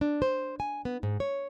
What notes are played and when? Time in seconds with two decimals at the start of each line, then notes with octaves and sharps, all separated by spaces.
0.01 D4
0.22 C5
0.60 G#5
0.85 B3
1.03 G#2
1.20 C#5